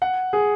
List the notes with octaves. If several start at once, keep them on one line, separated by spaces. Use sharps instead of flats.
F#5
G#4